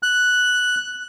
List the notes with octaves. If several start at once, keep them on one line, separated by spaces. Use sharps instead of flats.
F#6